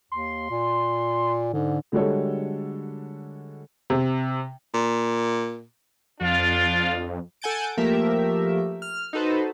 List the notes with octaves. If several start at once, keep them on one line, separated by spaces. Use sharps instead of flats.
D#2 C6
A#2
G#2 D3
D3 G3 G#3 F#4 A4 C#5
C3
A#2
F2 F3 D4 F4
A4 F#5 G#5 G6 A6 D7
F3 A3 A#3 G4 A#4 E5
F6
D#4 F#4 A4 B4 C5